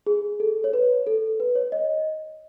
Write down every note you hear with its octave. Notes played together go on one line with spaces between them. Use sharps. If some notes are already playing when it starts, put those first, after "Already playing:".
G#4
A4
C#5
B4
A4
B4
C#5
D#5